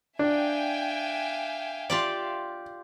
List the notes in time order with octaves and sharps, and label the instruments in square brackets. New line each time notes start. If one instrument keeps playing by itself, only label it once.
[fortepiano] D4 [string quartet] E5 F5 [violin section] G5 G#5
[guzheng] F4 G4 D5